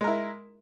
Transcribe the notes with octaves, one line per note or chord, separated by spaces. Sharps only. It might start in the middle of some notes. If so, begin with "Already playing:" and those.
G#3 E4 A#4